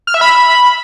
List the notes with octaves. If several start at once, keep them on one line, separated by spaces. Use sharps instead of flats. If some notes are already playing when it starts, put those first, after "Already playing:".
F6
E5
B5